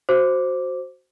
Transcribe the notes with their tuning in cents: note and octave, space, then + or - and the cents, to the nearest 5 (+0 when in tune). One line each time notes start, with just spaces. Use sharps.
F#4 +0 C5 +0 D6 -5